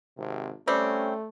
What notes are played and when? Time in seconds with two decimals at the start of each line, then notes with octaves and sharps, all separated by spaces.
0.18 G#1 C3
0.68 G3 A3 C4 C#4